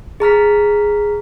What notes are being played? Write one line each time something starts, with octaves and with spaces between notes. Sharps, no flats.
G#4 A#5 F6 B6